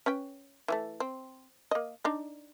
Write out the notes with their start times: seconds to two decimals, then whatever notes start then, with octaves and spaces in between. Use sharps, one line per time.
0.06 C#4 B4 G5
0.68 E3 F#3 A3
1.00 C4
1.71 A#3 D#5
2.04 D4 D#4 D5